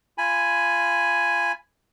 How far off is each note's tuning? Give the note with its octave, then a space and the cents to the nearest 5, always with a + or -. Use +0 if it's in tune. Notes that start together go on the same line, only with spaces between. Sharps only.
F4 -20 G#5 +0 B5 +0